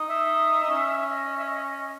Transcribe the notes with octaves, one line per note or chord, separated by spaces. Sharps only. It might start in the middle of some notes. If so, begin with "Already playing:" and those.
Already playing: D#4
E5
D#4
C#4
E5
D#5
D#5
E5
D#5